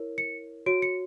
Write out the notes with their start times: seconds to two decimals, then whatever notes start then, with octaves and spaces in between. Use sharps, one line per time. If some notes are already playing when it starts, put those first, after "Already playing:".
Already playing: E4 A#4 C#5
0.18 C#7
0.66 F#4 C#5 D7
0.82 C#7